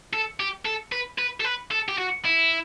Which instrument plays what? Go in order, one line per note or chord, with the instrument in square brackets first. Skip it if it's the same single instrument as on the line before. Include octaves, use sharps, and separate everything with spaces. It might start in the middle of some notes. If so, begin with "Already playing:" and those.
[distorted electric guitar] A4
G4
A4
B4
B4
A4
B4
A4
G4
F#4
E4